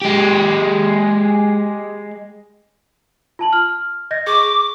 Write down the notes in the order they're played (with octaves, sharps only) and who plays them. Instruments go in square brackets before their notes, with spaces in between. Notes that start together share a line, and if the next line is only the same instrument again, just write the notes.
[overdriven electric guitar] G#3 G4
[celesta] F4 A5 F#7
F6
D#5 G6 A#6
[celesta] G#4 C#6 [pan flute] D6